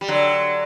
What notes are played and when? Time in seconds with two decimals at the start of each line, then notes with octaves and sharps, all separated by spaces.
0.01 G3
0.08 D3 F#3